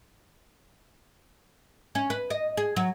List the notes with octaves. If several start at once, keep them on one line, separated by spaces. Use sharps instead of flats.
C#4
B4
D#5
G#4
F#3